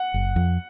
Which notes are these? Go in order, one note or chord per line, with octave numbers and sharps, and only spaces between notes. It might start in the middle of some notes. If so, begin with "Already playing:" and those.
Already playing: F#5
F#1
F2